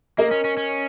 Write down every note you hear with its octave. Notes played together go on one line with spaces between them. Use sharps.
A#3 A#4 D#5
C#4
C#4
C#4